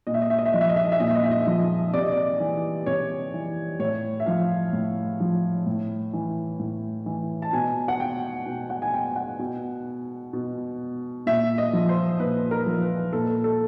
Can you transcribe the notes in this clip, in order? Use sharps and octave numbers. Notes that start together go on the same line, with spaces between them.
A#2 D#5
E5
D#5
E5
D#5
E5
F3 D#5
E5
D#5
E5
D#5
E5
A#2 D#5
E5
D#5
E5
D#5
F3
C3 D5
D#5
D5
E3
C3 C#5
E3
A2 C#5
E5
F3 F5
A2
F3
A2
E3
A2
E3
A5
B2 G#5
F#5
G5
B2
F#5
G#5
G5
F#5
B2
B2
A#2 E5
D#5
F3
C5
A#2 B4
A#4
F3
B4
A#2 A4
A4